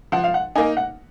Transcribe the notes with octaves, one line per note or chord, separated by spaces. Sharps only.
F3 F#5
F5
F#5
A#3 D#4 G#5
F#5